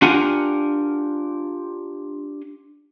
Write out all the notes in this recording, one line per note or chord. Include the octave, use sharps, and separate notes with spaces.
D4 F4 G4 A#4 F#5 G#5